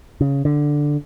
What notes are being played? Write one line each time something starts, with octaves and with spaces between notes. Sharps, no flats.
C#3
D3